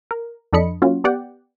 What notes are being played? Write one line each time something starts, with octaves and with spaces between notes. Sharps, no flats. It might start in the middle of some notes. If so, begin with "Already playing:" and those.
A#4
F2 D4 A4 D#5 B5 C#7
F#3 A#3 C#4 F4 F#4
B3 G4 D5 F#5 G5